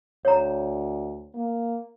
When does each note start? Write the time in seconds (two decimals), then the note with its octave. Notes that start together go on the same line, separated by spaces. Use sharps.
0.25 D2 C#5 A#5
1.34 A#3